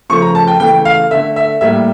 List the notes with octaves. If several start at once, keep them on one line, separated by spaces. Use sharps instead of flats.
C#3 F3 A3 C#6
A#5
A5
G5
C#3 E3 A3 G5
F5
D3 A3 E5
E5
A2 G3 A#3 E5